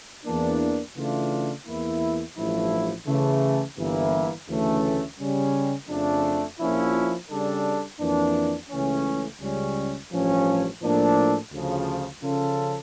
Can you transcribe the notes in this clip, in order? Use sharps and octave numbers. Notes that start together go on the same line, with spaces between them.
E2 E3 A#3 D4
C#3 E3 A3 D4 F4
E2 E3 A#3 E4
A1 G2 F3 A3 E4
C#3 E3 A3
G1 G2 E3 A#3 E4
D2 C#3 E3 A3 C#4
C#3 G3 C#4
F2 C#3 F3 A3 D4
A#1 A#2 F3 C#4 E4
C#3 G3 D4 A4
F2 E3 A#3 D4
C#2 C#3 E3 A3 C#4
C#2 C#3 G3 C#4
A1 G2 F3 C#4
A2 F3 A#3 D4 A4
D2 C#3 F3
C#3 F3 C#4 F4 A4